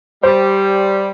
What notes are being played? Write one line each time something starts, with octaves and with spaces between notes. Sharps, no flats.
G3 C5